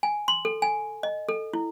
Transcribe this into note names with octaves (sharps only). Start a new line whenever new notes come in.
G#5
C6
A4
G#5
D#5
A4
E4